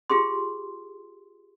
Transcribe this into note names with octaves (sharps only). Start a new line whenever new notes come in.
F4 G4 G#4 C6